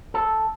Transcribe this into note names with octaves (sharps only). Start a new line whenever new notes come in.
A4